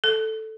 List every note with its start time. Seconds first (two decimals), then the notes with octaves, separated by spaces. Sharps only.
0.04 A4